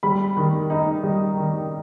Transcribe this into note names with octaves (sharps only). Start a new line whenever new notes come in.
G3 B5
D#3
D#4
G3
D#3